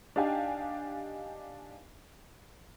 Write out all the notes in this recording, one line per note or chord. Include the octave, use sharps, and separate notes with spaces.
D4 D#4 G4 F5 G5 G#5